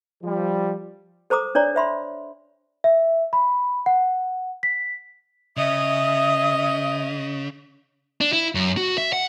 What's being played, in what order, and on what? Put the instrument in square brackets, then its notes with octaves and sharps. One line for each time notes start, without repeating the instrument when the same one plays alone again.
[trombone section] F3 G3
[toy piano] A4 C5 A#5 D6 D#6
D4 C#5 D5 A#5
C5 E5 B5 C6
[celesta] E5
B5
F#5
B6
[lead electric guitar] C#3 [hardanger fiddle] D#5 [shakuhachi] E5 [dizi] D#6
[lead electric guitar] D4
E4
F#2
F#4
E5
F#5